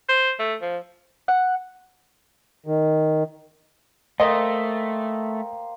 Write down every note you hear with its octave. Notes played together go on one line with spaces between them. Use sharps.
C5
A3
F3
F#5
D#3
A3 A#3 C5 D#5 G5